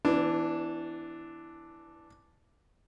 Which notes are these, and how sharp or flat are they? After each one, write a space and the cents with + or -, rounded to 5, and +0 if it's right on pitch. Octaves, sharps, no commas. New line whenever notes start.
E3 +0 B3 +45 D4 +0